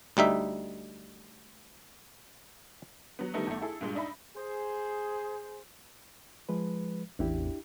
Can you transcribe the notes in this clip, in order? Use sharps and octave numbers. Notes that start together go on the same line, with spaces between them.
D2 G3 D#4 E5
F#3 B3
D3 D#3 G3 A3 B3 D#4
G1 A3
E4 G#4 A4
G2 A#2 G#3
D4 D#4 E5 B5
G#4 C5
F3 G#3 B4
A1 E2 D4 E4 G4